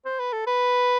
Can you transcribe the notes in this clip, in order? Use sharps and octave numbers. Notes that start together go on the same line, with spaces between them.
C5
B4
A4
B4